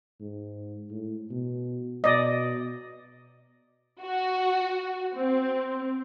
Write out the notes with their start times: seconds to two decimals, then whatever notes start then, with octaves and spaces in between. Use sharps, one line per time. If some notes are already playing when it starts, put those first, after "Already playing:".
0.20 G#2
0.91 A2
1.31 B2
2.04 B2 D5 D#5
4.02 F#4
5.16 C4